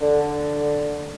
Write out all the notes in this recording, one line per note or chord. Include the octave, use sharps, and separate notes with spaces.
D3